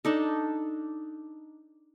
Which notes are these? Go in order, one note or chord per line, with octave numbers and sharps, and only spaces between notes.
D4 D#4 A4